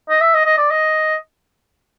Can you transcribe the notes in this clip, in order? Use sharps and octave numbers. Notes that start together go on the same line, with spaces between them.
D#5
E5
D#5
D#5
D5
D#5